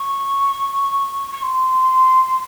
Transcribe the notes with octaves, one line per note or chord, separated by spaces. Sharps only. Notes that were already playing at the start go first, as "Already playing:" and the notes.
Already playing: C#6
C#6
C6